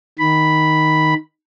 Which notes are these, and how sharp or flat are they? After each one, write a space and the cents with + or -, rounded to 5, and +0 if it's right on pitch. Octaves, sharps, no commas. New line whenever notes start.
D#3 +0 B5 +0